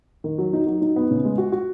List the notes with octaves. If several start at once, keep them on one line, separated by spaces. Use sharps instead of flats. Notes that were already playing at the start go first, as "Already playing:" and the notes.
D#3
F#3
D#4
F#3
D#4
B3
C#3
G#3
F#4
F#4